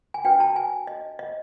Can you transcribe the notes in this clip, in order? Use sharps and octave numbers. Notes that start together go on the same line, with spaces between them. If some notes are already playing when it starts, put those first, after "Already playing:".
G#5
D4 F#4 B4 G5
A5
G#5
D#5
D#5